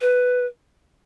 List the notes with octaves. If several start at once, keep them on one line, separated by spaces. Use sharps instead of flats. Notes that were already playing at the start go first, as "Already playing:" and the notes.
B4